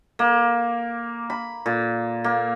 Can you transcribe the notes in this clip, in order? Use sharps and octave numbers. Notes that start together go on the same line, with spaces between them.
A#3
B5
A#2
A#3